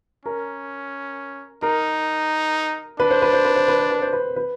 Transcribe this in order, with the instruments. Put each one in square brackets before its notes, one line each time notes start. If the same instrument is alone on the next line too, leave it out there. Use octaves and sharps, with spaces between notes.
[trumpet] C#4 [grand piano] A#4
[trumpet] D#4 [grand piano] A#4
[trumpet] D4 [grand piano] B4
[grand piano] C5
B4
C5
B4
C5
B4
C5
B4
C5
B4
B4